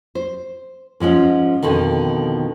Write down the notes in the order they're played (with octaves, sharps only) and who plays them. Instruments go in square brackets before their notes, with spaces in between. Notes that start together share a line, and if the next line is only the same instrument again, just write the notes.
[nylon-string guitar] C5
G#2 F3 G#3 C#4
F2 B2 D3 D#3